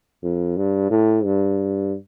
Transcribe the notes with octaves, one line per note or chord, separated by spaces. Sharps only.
F2
G2
A2
G2